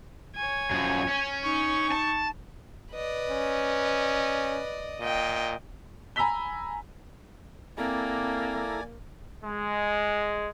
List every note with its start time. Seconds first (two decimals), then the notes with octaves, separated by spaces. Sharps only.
0.36 C#5 G#5
0.71 F#2 F3
1.09 C#4
1.44 D#4 C#6
1.91 A5
2.95 B4 D5 D#5
3.29 C#4
5.00 A#2 D#5 G5
6.16 G#5 A#5 B5 E6 B6 G7
7.78 A#3 C4 E4 A4 D5 G#5 A#5
9.44 G#3